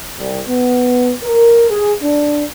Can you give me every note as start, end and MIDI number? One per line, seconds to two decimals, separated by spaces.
0.19 0.39 36
0.48 1.11 59
1.23 1.66 70
1.69 1.92 68
2.01 2.44 62